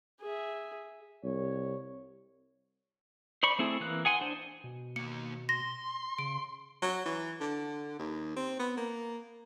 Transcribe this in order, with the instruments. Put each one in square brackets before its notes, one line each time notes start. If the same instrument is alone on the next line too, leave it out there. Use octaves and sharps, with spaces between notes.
[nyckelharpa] G#4 E5
[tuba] C2 [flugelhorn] C#5
[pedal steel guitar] C5 D5 B5 C#6
A3 C4 E4 G#4
E3 A#3 F#6
G#4 F#5 G#5 C6
D4 C5
[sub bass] B2
[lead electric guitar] D#3 A#3 [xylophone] C#7
[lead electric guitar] C6 [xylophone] A#6
[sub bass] C#3 [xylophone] D7
[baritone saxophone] F#3
E3
D3
D#2
C4
B3
A#3